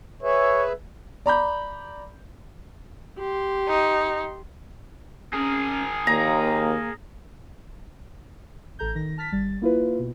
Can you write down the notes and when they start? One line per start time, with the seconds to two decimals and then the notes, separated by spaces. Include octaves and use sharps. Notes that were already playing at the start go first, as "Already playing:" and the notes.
0.23 G#4 B4 C#5 E5
1.26 D5 A#5 B5 G6
3.19 G4 C6
3.68 D#4
5.34 C#4 G#4 A#4
6.07 D#2 A#3 A#5
8.79 A1 A4 A#5 G6
8.95 D#3 A#6
9.18 A5 F6 A6 B6
9.32 G1 G3 A6
9.62 A#3 E4 F4 B4
9.99 B2